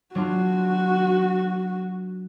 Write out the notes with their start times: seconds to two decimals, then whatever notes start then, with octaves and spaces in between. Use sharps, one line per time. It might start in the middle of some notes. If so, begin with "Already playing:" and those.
0.15 F#3 D4 F4 F#4